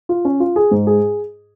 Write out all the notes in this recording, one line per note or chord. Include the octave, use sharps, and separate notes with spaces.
F4
C#4
F4
G#4
G#2
G#4